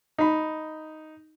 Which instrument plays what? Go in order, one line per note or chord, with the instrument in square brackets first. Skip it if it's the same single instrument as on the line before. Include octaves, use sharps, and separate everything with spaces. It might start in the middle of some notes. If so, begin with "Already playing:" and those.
[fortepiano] D#4 B5